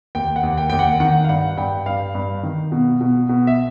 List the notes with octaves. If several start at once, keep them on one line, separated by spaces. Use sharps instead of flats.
D#2 G5
F#5
D#2
G5
D#2 G5
F#5
D#3 F#5
F5
G2 F#5
G2 G5
G2 F5
G2
D#3
B2
B2
B2
E5